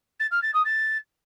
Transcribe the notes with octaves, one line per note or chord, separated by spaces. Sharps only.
A6
F6
A6
D#6
A6